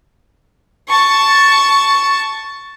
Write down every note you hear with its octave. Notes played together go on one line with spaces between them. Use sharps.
A5 C#6